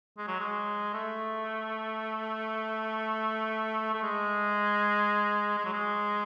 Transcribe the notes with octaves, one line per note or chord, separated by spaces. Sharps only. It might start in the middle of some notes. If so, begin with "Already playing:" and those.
G#3
F#3
G#3
A3
A3
G#3
G#3
F#3
G#3